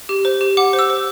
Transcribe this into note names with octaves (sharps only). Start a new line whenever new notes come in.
G4
C5
G4
F#5 D6
C5
E6
C5